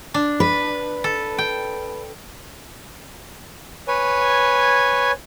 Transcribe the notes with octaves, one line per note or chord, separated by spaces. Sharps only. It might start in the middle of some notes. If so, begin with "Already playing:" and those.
D4
B4
A4
G5
B4 C#5 G#5